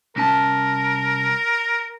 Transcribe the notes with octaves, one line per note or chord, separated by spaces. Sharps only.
C2 C#4 A#4 A5